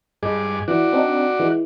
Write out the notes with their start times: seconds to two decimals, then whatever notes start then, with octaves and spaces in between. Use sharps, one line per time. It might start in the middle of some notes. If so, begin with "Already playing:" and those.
0.23 G2 G#3 G#4 D6
0.68 E3 F#4 D5
0.93 C4 D4 D#4
1.39 E3 G#3